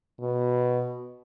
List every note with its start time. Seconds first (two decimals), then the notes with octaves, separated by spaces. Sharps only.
0.20 B2